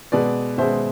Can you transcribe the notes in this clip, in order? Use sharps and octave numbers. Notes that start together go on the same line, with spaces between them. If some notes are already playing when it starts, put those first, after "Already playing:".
B2 G#3 B4 D5
B2 G#3 C5 E5